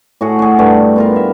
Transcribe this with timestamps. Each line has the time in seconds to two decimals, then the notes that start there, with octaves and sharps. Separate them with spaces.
0.21 A2 F#4 G#4 F#5
0.39 F#4 G#4
0.59 G2 A3
0.96 B3 F4 A#4
1.16 E5